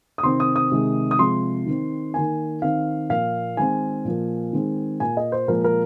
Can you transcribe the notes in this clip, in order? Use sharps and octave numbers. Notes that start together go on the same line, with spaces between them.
D#6
C3 D#3 C4 C6
D#6
D#6
C3 D#3 G#3
D#6
C3 F3 G#3 C4 C6
D#3 C4
D#3 A#3 G#5
D#3 C4 F5
A#2 F3 A#3 F5
D#3 G#3 C4 G#5
A#2 F3 A#3
D#3 G#3 C4
A#2 A#3 G#5
D#5
C5
A#2 F3 G#3 A#4
A#4